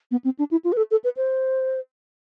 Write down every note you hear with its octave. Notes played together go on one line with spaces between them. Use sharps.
B3
C4
D4
E4
F4
B4
A4
A4
B4
C5